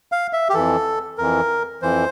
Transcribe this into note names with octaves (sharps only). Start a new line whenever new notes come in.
F5
E5
G4
F2 E3 A4
F2 E3 A#4
F2 E3 C5